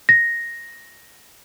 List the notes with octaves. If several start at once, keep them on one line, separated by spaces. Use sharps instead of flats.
A#6